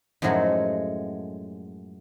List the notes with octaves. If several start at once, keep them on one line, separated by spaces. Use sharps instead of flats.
F#2 A2 F3 F#3 G#3 A3